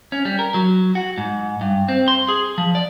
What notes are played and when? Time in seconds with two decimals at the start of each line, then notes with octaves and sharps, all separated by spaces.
0.12 C#4
0.25 G3
0.39 A#4
0.54 F#3
0.95 F#4
1.18 G#2
1.61 G2
1.88 C4
2.08 C6
2.28 G#4
2.58 F3
2.75 D5